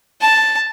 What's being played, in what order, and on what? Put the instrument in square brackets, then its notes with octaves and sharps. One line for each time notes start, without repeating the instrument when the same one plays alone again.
[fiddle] A5